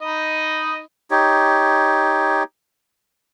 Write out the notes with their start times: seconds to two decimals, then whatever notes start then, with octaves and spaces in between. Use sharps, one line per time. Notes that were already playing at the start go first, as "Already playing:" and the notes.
0.01 D#4 D#5 B5
1.11 D#4 G4 C#5